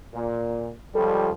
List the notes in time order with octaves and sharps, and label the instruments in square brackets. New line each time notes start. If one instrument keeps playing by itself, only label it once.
[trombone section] A#2
[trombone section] C#2 F3 G3 [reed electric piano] A4